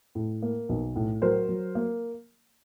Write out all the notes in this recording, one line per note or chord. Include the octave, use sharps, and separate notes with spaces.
A2
A#3
B1
A2
F#3 A#4 C5
F#3
A#3